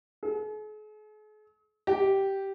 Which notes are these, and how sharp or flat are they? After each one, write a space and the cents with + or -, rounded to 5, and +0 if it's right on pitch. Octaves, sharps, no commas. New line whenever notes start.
G#4 +45
G4 -10